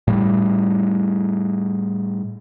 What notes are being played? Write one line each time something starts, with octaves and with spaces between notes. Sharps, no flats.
A2 G3